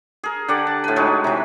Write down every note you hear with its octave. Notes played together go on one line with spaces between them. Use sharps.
G#4 A#4
D3 G4 D5 F#5
A5
A2 B4
F#3 G#3 D#4
C3 E3